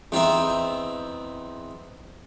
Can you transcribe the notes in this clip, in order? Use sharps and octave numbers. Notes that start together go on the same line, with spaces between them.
E2 C4 D#4 E5